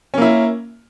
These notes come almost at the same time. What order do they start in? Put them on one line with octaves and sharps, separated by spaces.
C#4 A#3 E4